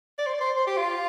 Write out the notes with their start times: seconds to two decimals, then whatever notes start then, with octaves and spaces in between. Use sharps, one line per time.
0.18 D5
0.26 C5
0.34 D5
0.41 C5
0.56 C5
0.67 G4
0.77 F4